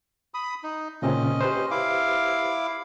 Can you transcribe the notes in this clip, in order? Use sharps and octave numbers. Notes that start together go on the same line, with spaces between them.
B5 D#6
D#4
A#2 C#3 C4 C#4 D#5
G4 B4 C5
E4 F5 D6